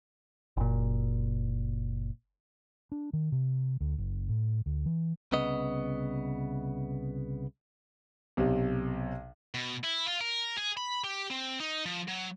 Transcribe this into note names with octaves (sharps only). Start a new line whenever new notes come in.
F#1 A#2
D4
D#3
C3
D2
F#1
A2
D2
E3
C2 C#3 B3 D#5
B1 C3
B2
E4
F4
A#4
G#4
B5
G4
C4
D#4
F3
F#3